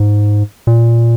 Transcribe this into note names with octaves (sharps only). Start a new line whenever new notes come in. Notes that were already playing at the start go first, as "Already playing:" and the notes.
Already playing: G#2
A#2